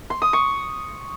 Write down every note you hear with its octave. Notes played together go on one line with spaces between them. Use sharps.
C6
D#6
C#6